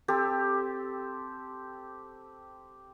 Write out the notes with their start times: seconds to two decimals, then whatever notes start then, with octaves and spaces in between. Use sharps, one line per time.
0.08 C4 G4 A4